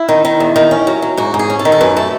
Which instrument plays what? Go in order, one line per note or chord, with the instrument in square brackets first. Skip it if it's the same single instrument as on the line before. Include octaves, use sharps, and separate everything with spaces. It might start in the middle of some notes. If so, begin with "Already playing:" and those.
Already playing: [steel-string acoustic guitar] E4
D#3
D#3
E2
D#3
C#4
F#3
F#3
G#2 F#4
G#2
G#4
C#4
A4
D#3
A4
F#2 B4
A3 A4